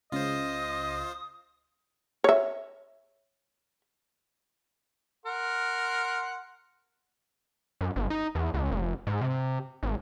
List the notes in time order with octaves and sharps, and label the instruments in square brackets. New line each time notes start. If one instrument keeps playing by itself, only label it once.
[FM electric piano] C#2 C#3 [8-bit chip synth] F4 C5 [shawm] D#5 [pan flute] D#6
[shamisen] C#5 E5
[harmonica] A#4 F#5 C6
[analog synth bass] F#2
G1
D#4
E2
C#2
F1
G#2
C3
G#1